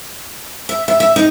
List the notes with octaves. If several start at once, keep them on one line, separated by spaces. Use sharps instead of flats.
E5
E5
E5
D#4